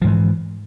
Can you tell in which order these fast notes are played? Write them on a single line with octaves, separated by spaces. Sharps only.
F3 G#2 E3